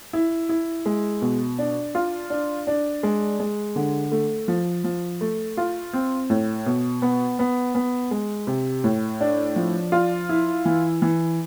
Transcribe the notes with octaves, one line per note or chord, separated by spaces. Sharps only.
E4
E4
G#3
B2
D4
F4
D4
D4
G#3
G#3
D3
A3
F3
F3
A3
F4
C4
A2
B2
B3
B3
B3
G#3
C3
A2
D4
F3
F4
E4
E3
E3